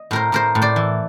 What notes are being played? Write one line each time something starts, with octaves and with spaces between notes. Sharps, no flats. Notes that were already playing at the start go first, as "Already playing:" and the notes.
Already playing: D#5
A2 A#4 C5
A2 A#4 C5
A2
C5 D5
E3